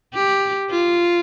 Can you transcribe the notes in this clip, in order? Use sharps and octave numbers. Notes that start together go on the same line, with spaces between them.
G4
F4